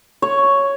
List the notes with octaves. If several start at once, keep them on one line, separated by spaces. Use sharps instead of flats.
C#5